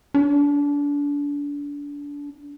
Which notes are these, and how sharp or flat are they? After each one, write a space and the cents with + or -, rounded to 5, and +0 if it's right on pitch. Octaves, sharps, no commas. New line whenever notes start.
D4 -30